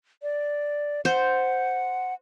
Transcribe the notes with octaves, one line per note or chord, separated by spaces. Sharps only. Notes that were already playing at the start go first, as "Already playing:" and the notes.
D5
C5 F#5